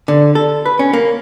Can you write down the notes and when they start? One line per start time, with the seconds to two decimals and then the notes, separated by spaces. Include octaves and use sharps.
0.08 D3
0.35 A4
0.66 B4
0.79 C#4
0.93 A#3